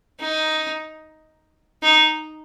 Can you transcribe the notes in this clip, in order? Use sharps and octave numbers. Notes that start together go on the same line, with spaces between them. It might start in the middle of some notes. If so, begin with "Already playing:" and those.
D#4
D#4